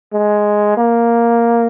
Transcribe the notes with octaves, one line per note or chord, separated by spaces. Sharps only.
G#3
A#3